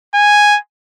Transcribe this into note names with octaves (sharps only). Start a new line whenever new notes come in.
G#5